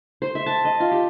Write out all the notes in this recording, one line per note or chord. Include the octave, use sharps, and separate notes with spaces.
C5
E5
A5
D#5
F4
G4